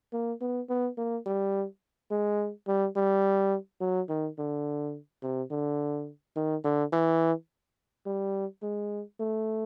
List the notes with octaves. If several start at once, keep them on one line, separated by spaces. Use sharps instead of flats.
A#3
B3
B3
A#3
G3
G#3
G3
G3
F#3
D#3
D3
C3
D3
D#3
D3
E3
G3
G#3
A3